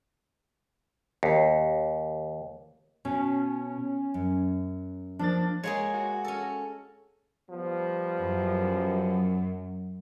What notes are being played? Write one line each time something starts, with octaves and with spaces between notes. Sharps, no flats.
D#2
B2 C#4
F#2
F3 A#3 D4 A6
G#3 A#3 G#4 C#5
F#4
C#4 A4
F3 G3 B3
F#2